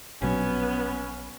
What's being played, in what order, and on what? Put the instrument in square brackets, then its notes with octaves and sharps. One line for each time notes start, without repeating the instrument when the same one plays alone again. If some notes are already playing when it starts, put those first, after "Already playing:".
[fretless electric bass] A#1 B2 F#3 [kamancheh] B3 [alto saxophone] C#4